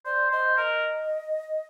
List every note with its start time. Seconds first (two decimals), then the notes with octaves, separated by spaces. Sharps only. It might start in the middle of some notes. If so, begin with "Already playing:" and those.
0.05 C5 D5
0.31 C5 D#5
0.57 A#4 D#5